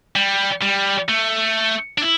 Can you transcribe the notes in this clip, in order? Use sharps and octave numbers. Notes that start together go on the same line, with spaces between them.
G3
G3
A3
D4
E4